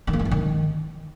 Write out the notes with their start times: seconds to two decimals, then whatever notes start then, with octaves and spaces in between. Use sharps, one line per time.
0.07 D#3
0.13 A#3
0.19 D#3
0.25 E3
0.31 D#3